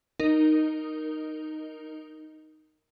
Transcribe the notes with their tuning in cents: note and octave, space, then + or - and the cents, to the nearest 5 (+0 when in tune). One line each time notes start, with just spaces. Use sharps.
D#4 -5 A#4 +0